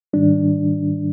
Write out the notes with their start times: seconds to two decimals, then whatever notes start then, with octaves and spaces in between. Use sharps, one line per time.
0.13 G#2 D#3 G3 D4